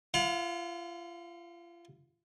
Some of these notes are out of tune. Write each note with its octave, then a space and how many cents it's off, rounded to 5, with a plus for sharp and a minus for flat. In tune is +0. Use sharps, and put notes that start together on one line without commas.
F4 -35 F5 +40